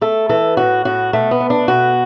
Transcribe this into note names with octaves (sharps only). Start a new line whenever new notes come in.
A3 A4
E3 A4
A2 F#4
A2 F#4
B2 A3
B3
A3
D4
B2 F#4